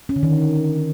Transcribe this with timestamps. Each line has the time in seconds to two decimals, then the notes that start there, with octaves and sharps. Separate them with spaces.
0.09 C#4
0.16 D3
0.23 D#3